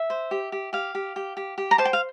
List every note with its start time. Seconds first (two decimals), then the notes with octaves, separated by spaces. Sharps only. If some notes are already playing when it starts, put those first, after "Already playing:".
Already playing: E5
0.10 C5
0.31 G4
0.52 G4
0.73 G4 F5
0.95 G4
1.16 G4
1.37 G4
1.58 G4
1.71 A#5
1.78 C5 A5
1.85 G5
1.93 F5